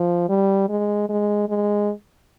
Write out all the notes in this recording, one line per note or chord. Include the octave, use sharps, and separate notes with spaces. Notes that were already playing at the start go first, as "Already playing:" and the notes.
Already playing: F3
G3
G#3
G#3
G#3